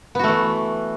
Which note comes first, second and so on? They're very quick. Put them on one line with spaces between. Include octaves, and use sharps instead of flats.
B3 F#4 A3 E3